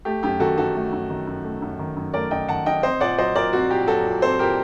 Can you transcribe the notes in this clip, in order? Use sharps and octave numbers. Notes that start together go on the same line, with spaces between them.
A3 G4
F#2 G4
D#3 F#4 A4
F#2 F#4 A4
A3
F#2
D#3
F#2
A3
F#2
D#3
F#2
A3 A#4 D5
F#2 D#5 G5
D#3 F#5 A5
F#2 D#5 G5
C4 C5 D#5
A#2 D5 F#5
F#3 C5 D#5
A#2 A#4 D5
C4 F#4
A#2 G4
F#3 F#4 A4
A#2
C4 A4 C5
A#2 G4 A#4